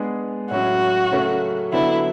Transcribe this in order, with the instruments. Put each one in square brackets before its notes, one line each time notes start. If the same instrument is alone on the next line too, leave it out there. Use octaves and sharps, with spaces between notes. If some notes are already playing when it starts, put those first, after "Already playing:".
Already playing: [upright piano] G#3 B3 D4 G#4
[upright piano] A2 F#3 C#4 [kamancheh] F#4
[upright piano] C#3 F#3 A3 C#4
[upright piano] D3 F#3 B3 D4 A4 [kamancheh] E4